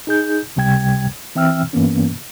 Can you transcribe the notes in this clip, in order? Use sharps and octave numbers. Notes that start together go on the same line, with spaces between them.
D#4 G#4 G6
C#2 C3 G3 G5 G#6
E3 C4 E5 G5 E6 F6
G2 E3 A#3 B3 C#4